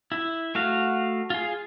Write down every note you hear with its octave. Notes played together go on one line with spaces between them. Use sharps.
E4
A3 F#4 F5
F4 G#4